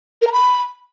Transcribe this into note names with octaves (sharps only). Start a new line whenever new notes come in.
A#4
A#5
B5